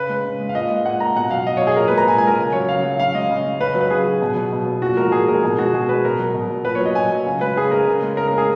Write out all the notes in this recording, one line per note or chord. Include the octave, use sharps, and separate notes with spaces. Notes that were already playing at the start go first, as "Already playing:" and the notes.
Already playing: C#3 B4
G#3
C#3
G#3
F5
A#2 D#5
G#3
A#2 F#5
G#3 A#5
B2 F#5
F#3 F5
B2 D#5
C#5
F#3
G#4
A#2 A#4
B4
G#3
A#5
A#2 G#5
G#5
G#3 A#4
C#3
F#3 C#5
C#3 F5
F#3
C#3 F5
G#3 D#5
C#3
G#3
C#3 B4
F#3
B4
C#3 G#4
F#3
B2
F#3
B2
F#3
A#2 F#4
F3 G#3 A#4
A#2 G#4
F3 G#3 A#4
B2 G#4
G#3 F#4
B2 G#4
G#3 B4
B2 A#4
F#3
B2
F#3
A#2 B4
C#5
F#3
D#5
A#2 G#5
F#3
C#3
G#3 B4
C#3 G#4
G#3 A#4
C#3
G#3
C#3 A#4
A#4
G#3
G#4